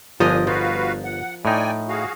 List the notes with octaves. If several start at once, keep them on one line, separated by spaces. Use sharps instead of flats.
G1 F2 F3 D4 A#4 D#5 G#5
F3 F#4 B4 F5
F#5
A2 D#4 D5 G5 G#5
F#4 G#4 F5